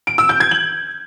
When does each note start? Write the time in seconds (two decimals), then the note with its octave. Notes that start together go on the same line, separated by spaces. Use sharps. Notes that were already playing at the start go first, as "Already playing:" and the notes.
0.07 D7
0.18 E6
0.29 G6
0.40 G#6
0.51 F#7